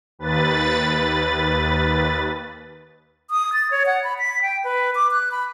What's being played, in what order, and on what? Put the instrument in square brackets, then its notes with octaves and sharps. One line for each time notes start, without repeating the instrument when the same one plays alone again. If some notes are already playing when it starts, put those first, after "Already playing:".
[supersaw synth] D#2 B4 A6
[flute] D#6
A6
C#5
F#5
B5
B6
G5
B4
D6
F#6
B5